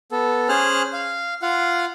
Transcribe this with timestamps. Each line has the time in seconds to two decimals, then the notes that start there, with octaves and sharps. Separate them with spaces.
0.12 B3 A4
0.49 C#4 G#4 C5 F6 F#6
0.93 F5
1.42 F4 F5 F#5